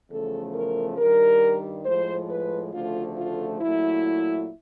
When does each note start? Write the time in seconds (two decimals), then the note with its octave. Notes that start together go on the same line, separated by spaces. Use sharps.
0.10 E2 C#3 F3 A3 A4
0.54 A#4
0.97 G2 D#3 G3 A#4
1.85 A2 F3 G#3 C5
2.29 B4
2.73 D2 C#3 F3 A3 F4
3.17 F4
3.61 A#2 F#3 A3 E4